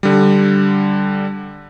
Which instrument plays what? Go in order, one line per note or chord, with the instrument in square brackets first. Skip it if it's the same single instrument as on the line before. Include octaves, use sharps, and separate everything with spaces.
[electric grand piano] D3 G3